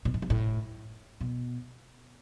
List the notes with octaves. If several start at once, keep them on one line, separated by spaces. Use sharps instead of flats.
B2
A2
G#2
A2
B2